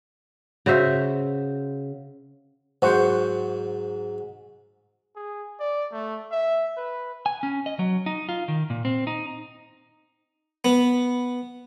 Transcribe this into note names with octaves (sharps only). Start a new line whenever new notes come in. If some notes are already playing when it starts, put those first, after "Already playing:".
C#3 F#4 C5 E5
G#2 F#3 C5 F#5 C#6
G#4
D5
A3
E5
B4
G#5
C#4
D#5
F#3
D#4
F4
D#3
A#2
C4
D#4
B3